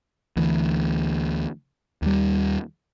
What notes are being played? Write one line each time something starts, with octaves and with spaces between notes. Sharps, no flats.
D2 E3
D#2 G3